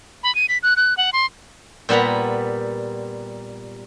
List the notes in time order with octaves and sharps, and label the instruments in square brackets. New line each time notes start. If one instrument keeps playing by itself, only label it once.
[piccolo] B5
D#7
B6
F#6
F#6
F#5
C6
[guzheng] A#2 G3 B3 B4 A#5